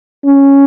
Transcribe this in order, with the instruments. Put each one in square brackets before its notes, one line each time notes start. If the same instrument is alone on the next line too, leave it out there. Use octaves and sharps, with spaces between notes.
[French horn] C#4